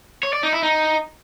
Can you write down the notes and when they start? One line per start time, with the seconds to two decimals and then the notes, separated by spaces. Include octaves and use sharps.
0.23 C#5
0.33 D5
0.43 D#4
0.53 E4
0.63 D#4